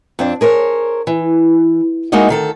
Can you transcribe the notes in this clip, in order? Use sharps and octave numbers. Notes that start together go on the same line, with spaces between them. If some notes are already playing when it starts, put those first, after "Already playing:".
F2 C4 D4
G#4 A#4 C5 C#5
E3
G#3 A#3 D#4 E4 F#4 D#5
D2 D#3 A4